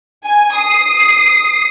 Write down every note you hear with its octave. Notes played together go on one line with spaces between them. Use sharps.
G#5
D#6 C7